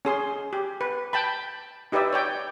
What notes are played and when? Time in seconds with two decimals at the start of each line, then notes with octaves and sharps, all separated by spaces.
0.05 C#4 G#4 C6
0.53 G4
0.81 B4
1.13 G5 A5 B5
1.92 D#4 G4 B4 D5 E5
2.13 C#5 D5 G5